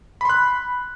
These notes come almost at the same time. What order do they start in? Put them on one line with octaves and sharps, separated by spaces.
B5 C6 F#6